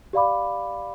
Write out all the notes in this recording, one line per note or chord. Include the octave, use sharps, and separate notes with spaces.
G4 D5 F5 B5 D6